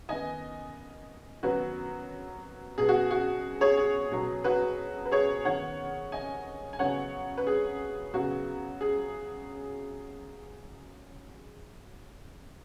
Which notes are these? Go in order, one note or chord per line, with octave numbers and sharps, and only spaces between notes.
D#3 B3 D#5 G#5
D#3 F#3 B3 F#4 B4
B2 B3 G#4
F#4
F#4
G#4 C#5
G#4
B2 F#3 B3
F#4 B4
B4
G#4 C#5
D#3 B3 C#5 F#5
D#5 G#5
G#5
C#3 F#3 B3 C#5 F#5
B4
G#4
C#3 F#3 B3 F#4
G#4